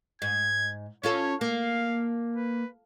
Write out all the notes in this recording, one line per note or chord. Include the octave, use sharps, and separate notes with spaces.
G#2 G#6
C#4 F4 A4 C#5
A#3 F5
B4